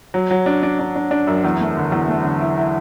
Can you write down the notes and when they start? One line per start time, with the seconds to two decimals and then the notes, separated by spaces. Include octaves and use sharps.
0.14 F#3
0.31 F#3
0.46 D4
0.63 D4
0.79 D4
0.96 D4
1.11 D4
1.27 F#2
1.44 E2
1.60 A3
1.77 D3
1.92 E2
2.08 A3
2.24 D3
2.41 E4
2.57 E4